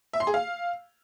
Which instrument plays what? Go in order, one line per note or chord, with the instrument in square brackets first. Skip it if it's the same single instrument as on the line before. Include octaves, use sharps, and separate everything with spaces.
[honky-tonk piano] E5
C6
G#4
F5